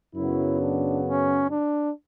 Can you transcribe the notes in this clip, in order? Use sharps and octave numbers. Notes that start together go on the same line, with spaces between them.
F#2 C#3 F#3 B3 E4
D4
C#4
D4